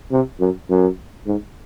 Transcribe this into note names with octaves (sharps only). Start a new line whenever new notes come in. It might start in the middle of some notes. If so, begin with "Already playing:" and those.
C3
F#2
F#2
G#2